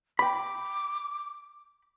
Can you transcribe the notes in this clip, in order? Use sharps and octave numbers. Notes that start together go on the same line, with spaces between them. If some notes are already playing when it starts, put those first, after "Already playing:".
G5 B5 D6